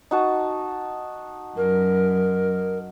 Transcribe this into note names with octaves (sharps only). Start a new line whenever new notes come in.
D#4 F#4 A5
F#2 A#4